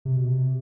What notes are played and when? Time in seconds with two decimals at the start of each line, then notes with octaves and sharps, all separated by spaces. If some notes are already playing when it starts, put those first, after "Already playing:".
0.05 C3
0.16 B2
0.28 C3